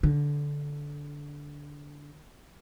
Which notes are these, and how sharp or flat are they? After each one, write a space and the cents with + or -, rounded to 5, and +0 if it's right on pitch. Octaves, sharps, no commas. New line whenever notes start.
D3 -15